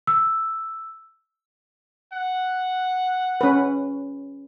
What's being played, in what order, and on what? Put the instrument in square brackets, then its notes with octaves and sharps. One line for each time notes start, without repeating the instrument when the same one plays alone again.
[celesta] E6
[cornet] F#5
[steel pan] C#4 B4